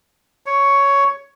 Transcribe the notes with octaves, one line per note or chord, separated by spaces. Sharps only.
C#5